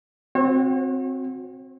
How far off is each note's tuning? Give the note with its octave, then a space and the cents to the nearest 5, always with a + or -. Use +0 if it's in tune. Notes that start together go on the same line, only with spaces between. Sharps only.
C4 +0 F#4 -20 C#5 -40